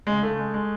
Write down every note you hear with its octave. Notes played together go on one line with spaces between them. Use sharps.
C#3 G#3
C#3 A3
G#3
G#3